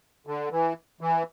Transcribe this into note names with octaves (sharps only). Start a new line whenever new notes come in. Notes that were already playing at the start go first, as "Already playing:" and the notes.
D3
E3
E3